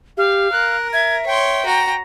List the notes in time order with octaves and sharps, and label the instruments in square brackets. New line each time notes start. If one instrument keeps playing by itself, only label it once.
[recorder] G4 [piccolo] F5
[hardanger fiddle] A#4 [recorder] F#6
[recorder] E5 [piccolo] G#6
[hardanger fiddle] C#5 C6 [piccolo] G5
[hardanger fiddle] F#4 A#5